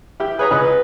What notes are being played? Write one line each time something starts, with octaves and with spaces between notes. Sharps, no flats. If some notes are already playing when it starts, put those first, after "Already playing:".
E4 G4
G#4 B4 C#5 A#5
C#2 B4 D#5 F#6